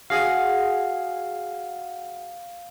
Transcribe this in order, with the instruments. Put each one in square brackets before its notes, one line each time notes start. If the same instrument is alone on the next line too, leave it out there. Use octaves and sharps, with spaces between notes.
[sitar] F#4 G#4 [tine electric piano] F5